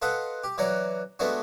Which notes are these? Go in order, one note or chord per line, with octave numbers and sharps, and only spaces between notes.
F4 A4 B4 D#5 F#5
G4
E3 F#3 D5 F#5 A#5
G#3 A3 B3 D4 F#4